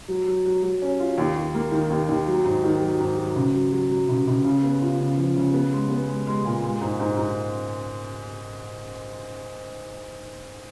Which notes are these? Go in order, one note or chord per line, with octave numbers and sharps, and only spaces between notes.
F#3
F#3
F#3
F#3
C#4
F4
D#2
D#2
A#3
D#3
D#2
D#2
F#3
G#2
D#3
F#3
G#2
F#3
C#2
F#3
F#3
F#3
C#2
C#2
C#3
B3
F4
C#3
F3
C#3
B3
G#3
B3
G#3
G#3
A#2
G#3
G#2
G#2
G#2